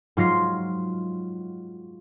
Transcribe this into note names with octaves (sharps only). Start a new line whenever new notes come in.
G#2 F#3 F4 C6 A#6 C7